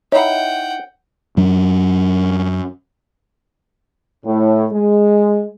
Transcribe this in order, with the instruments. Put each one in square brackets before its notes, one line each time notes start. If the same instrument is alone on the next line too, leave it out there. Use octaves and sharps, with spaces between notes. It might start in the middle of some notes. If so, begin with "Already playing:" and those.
[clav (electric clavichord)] D#4 E4 [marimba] C#5 [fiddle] F#5 G5
[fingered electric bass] F#2 F#3 D4
[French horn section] A2
G#3